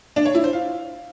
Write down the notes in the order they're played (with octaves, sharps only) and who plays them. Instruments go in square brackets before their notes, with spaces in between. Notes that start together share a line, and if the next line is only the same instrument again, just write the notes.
[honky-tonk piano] D4
C#5
E4
C5
F5